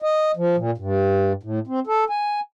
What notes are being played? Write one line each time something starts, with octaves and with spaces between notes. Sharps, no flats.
D#5
F3
A#2
G2
A2
C4
A4
G#5